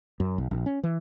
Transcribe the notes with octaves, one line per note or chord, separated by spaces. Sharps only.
F#2
B1
A#1
C#4
E3